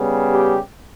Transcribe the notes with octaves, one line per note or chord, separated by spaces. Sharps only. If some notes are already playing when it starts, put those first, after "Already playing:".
Already playing: C#3 G3 B3
G4